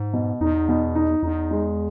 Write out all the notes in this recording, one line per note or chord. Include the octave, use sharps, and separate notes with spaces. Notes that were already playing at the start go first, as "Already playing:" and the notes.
Already playing: G#2
B2
E2 D#4
B2
D#4
E2 D#4
G#3